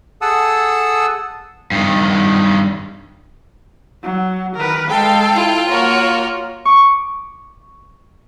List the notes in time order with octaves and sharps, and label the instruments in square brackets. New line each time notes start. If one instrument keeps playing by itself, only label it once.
[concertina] G#4 A4 F#5 A5 D#6 E6
[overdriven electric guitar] G2 D#3
[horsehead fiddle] F#3
[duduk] D#3 [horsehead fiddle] A#4 B4
[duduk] G#3 [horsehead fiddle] A4 [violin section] F5 G5
[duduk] E4 [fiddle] F4
[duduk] A#3 [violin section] F#4 C#5 [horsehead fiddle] A#4
[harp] C#6 D6